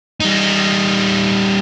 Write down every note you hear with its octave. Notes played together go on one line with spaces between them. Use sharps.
G3 D#4